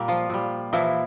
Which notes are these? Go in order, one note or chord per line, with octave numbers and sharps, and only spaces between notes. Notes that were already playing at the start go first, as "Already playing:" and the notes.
Already playing: A#2 G3 A#3
F3 F4
A#2 G3
A#2 E3 F3 E4